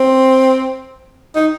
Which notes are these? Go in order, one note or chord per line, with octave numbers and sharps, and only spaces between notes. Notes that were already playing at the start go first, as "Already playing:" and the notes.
Already playing: C4
D#4